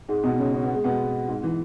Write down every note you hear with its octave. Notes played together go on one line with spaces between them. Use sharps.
G#2 G#3
B2 B3
C#3 C#4
C#4
B3
G#3
B2 B3
G#2 G#3
E3